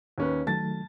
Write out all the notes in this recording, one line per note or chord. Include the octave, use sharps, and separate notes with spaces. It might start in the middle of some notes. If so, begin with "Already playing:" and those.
D#2 C#4 B4
D#3 F#3 A3 A5 A6